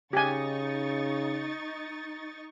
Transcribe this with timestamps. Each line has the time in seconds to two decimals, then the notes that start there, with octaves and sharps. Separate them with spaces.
0.13 C#3 D#4 G4 G#5 C#6 A6